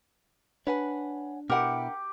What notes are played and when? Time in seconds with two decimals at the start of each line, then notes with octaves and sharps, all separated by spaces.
0.67 D4 B4 C#5 F#5 G#5
1.50 B2 E4 G4 A#4 F#5